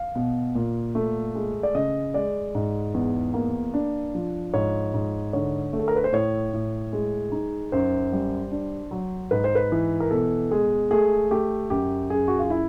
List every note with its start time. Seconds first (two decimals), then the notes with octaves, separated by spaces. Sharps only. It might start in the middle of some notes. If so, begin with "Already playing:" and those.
Already playing: F5
0.16 B2
0.55 A#2
0.95 A3
1.35 G#3
1.63 D5
1.75 C#3 D#5
2.14 G#3 D5
2.55 G#2
2.94 E2
3.34 A#3
3.74 D4
4.15 F3
4.54 G#2 C#5
4.94 G#2
5.33 D3 C#5
5.73 A3
5.79 A4
5.88 A#4
5.96 B4
6.04 C5
6.12 A2 C#5
6.53 A2
6.93 G#3
7.32 D#4
7.72 F#2 C5
8.13 G3
8.51 D4
8.91 F#3
9.31 G#2 B4
9.44 C5
9.55 B4
9.72 E3
10.00 A#4
10.11 B2 A4
10.51 G#3 G#4
10.91 A3 G#4
11.31 A3 G4
11.70 F#2 G4
12.10 F#2 G#4
12.28 F#4
12.39 F4
12.50 E4